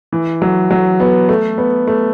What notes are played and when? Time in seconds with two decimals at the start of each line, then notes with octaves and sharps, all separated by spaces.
0.12 E3
0.42 F#3
0.71 F#3
1.00 B3
1.29 A3
1.58 B3
1.88 A3